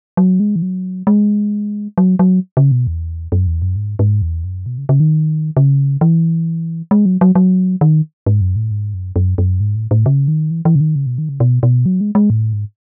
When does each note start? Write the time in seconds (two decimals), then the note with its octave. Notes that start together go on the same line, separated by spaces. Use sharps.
0.17 F#3
0.40 G#3
0.56 E3
0.62 F#3
1.07 G#3
1.98 F#3
2.19 F#3
2.57 C#3
2.71 B2
2.87 E2
3.32 F#2
3.47 E2
3.62 F#2
3.76 G#2
3.99 G#2
4.22 E2
4.44 F#2
4.66 B2
4.78 C#3
4.89 C#3
5.00 D#3
5.57 C#3
6.01 E3
6.91 G#3
7.06 F#3
7.21 F#3
7.35 F#3
7.81 D#3
8.26 G#2
8.41 F#2
8.56 A2
8.71 G#2
8.94 F#2
9.16 F#2
9.38 F#2
9.60 G#2
9.75 A2
9.91 A2
10.06 C#3
10.28 D#3
10.51 E3
10.65 E3
10.75 C#3
10.80 D#3
10.95 C#3
11.06 B2
11.18 D#3
11.29 C#3
11.40 B2
11.63 B2
11.86 F#3
12.01 G#3
12.15 G#3
12.30 A2
12.53 G#2